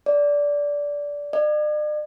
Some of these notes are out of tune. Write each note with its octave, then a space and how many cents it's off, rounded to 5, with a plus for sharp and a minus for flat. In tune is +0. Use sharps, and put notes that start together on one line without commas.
D5 -15
D5 +45